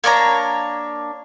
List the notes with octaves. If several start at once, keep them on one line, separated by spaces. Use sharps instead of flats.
A#3 D4 C#5 A#5